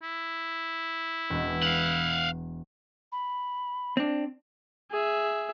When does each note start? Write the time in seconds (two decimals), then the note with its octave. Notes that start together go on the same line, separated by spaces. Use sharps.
0.03 E4
1.30 E1 B3
1.62 F5 F#5
3.12 B5
3.97 C4 D4
4.91 G#4 E5